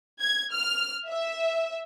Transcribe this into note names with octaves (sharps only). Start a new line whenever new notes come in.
G#6
F6
E5